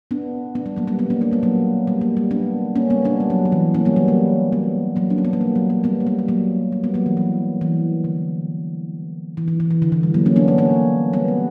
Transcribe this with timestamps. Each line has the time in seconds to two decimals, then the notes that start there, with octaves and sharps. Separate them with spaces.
0.11 B3 D4
0.55 B3 D4
0.66 G3 B3
0.76 F#3 A#3
0.87 G3 B3
0.99 B3 D4
1.10 A#3 C#4
1.21 B3 D4
1.32 G3 B3
1.43 F#3 A#3
1.87 G3
2.01 F#3 A#3
2.17 G3
2.31 B3 D4
2.76 A#3 C#4
2.90 G3 B3
3.05 B3 D4
3.20 G3
3.30 F#3
3.45 F#3
3.52 E3
3.74 A#3 C#4
3.85 G3 B3
3.96 F#3 A#3
4.08 G3
4.52 G3 B3
4.96 F#3 A#3
5.10 D4
5.18 C#4
5.25 B3
5.33 A#3
5.41 G3
5.56 F#3
5.70 F#3 A#3
5.84 G3 B3
6.00 A#3
6.07 G3 B3
6.19 G3
6.28 F#3 A#3
6.72 G3
6.84 G3 B3
6.94 F#3 A#3
7.06 E3
7.17 F#3
7.61 E3
8.04 D3
9.37 E3
9.48 E3
9.60 E3
9.71 E3
9.82 D3
9.92 E3
10.03 G3
10.14 F#3 A#3
10.26 A#3 C#4
10.36 B3 D4
10.48 A#3 C#4
10.58 A#3 C#4
11.13 G3 B3
11.28 G3